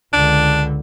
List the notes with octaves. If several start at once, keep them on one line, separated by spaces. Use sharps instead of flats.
C#2 D3 D4